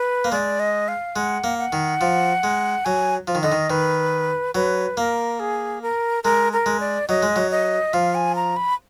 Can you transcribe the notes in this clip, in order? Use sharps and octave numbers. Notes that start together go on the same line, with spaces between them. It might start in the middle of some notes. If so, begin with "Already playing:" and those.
Already playing: B4
A#3
G#3 D5
D#5
F5
G#3 F#5
A#3
F#5
D#3
F3
G#3
F#3 G#5
F3
D#3
D3 D#5
D#3
D#3 B4
F#3 B4
A#3 A#4
G#4
A#4
G#3 A#4
A#4
G#3
D5
F#3 D#5
G#3
F#3
D#5
F3 F5
G#5
A#5
B5